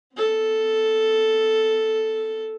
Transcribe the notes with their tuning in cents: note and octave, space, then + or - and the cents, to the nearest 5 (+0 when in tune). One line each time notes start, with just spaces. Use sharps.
B3 +30 A4 +0